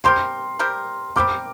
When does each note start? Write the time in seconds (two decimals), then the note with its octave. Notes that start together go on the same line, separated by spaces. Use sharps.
0.04 G3 C4 G4 A#4 C6
0.59 G3 C4 G4 A#4
1.16 G3 C4 G4 A#4 D6